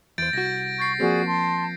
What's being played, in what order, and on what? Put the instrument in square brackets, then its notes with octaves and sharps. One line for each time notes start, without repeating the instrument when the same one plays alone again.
[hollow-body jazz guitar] E2 C5 [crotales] G6 A6 D7
[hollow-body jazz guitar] C2 F#4 [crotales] A#6
[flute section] C#6 [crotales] G6 A6 C7
[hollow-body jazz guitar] F3 A#3 C4 [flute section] F#4 G#4 D5
[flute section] A5 C6